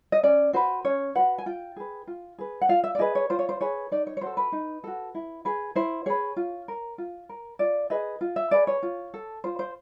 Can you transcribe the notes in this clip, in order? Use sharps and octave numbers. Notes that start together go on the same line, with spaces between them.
D#5
C#4 D5
F#4 B4 C5
C#4 C#5
F#4 B4 F#5
G#5
F4 G5
G#4 B4
F4
G#4 B4
F#5
F4 F5
E5
D5
G#4 B4 D#5
C#5
F4 C5
C#5
C5
G#4 B4 C#5
D#4 D5
C#5
C#5
F#4 A4 C5
B4
D#4
F#4 A4
E4
G#4 B4
E4 C5
G#4 B4 C#5
F4
A#4
F4
A#4
F4 D5
G#4 B4 D#5
F4
E5
G#4 B4 D5
C#5
F4
A4
F4 C5
C5